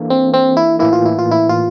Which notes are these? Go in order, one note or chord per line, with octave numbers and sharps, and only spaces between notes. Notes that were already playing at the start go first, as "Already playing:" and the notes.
Already playing: E3 A#3 D4 A4
C4
C4
E4
A2 E3 A#3 E4
F4
E4
F4
E4
F4